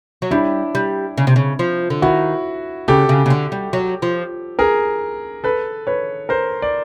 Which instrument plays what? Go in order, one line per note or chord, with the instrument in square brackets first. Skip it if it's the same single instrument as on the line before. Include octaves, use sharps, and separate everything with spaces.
[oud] F#3
[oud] G3 [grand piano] D4 E4
[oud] G3
C#3
C3
C#3
F3
D3
[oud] D#3 [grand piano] E4 F#4
[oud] C#3 [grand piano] G4 A4
[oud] C#3
C#3
D3
G3
F#3
F3
[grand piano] G#4 A#4
A4 B4
B4 C#5
A#4 C5
D5